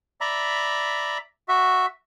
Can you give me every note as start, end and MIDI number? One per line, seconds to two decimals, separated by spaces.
0.21 1.18 74
0.21 1.18 76
0.21 1.18 82
0.21 1.18 83
1.48 1.86 66
1.48 1.86 76